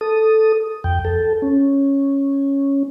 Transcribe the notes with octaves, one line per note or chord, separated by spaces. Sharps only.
A4 D#6
F2 G5
A4
C#4